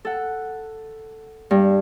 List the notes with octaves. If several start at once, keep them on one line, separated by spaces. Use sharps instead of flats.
A4 F#5
G2